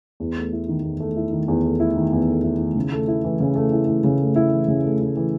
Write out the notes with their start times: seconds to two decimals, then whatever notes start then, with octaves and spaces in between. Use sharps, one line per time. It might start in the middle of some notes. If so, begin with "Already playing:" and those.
0.20 E2
0.37 A3
0.53 E4
0.69 D#3
0.83 E2
1.00 A3
1.16 E4
1.33 D#3
1.48 E2
1.64 A3
1.80 E4
1.96 D#3
2.13 E2
2.29 A3
2.43 E4
2.60 D#3
2.75 C#3
2.92 A3
3.08 E4
3.24 E3
3.40 C#3
3.55 A3
3.73 E4
3.87 E3
4.04 C#3
4.19 A3
4.36 E4
4.52 E3
4.68 C#3
4.84 A3
5.00 E4
5.17 E3